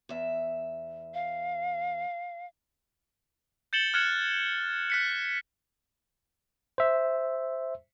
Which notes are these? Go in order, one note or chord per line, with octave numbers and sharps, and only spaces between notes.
E2 E5
F5
G6 A6 C#7 E7 F#7 G7
F6 F#6 G#6 C#7 E7 F#7
F#6 B6 C#7
C5 E5